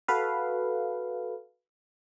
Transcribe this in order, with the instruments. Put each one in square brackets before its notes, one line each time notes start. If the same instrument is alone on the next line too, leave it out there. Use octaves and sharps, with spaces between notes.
[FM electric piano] F#4 A4 B4 F5